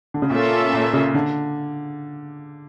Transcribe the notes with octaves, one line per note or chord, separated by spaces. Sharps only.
D3
C#3
A#2 A#3 C#4 F4 A4 E5
A#2
C#3
D3